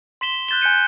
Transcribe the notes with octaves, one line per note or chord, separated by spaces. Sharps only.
C6 B6 E7 G7
F#6 G6 A6 E7 G7
G#5 F#6 G6 C#7 D#7